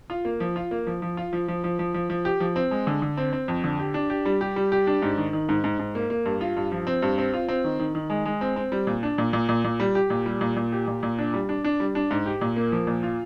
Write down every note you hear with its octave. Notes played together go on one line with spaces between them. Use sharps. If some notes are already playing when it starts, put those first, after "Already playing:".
F4
A#3
F3
F4
A#3
F3
F3
F4
F3
F3
F3
F3
F3
F3
G4
F3
C4
G#3
D3
D3
C4
C4
F2
D3
G4
D4
G4
G3
G4
G3
G4
D4
G#2
D#3
D#3
G#2
G#2
G#2
A#3
A#3
G2
F4
G2
F3
C4
G2
C4
F4
C4
D#3
D#3
D#3
G#3
G#3
C4
C4
G3
A#2
D4
A#2
A#2
A#2
A#2
G3
G4
A#2
G3
A#2
A#2
G4
A#2
A#2
D4
G3
D4
D4
G3
D4
G#2
G4
A#2
A#3
F3
A#2
F4